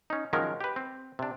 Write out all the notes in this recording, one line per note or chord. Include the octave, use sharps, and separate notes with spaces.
C#4 D#4
D#3 F3 F#3 G#3 C#4 A#4
G4 B4
C4
C3 D4